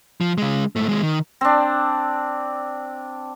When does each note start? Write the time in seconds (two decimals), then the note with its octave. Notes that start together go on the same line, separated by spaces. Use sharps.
0.21 F3
0.38 C#3 G#3
0.76 G#2 A3
0.89 D#2 G#3
1.03 D#3
1.41 C4 D4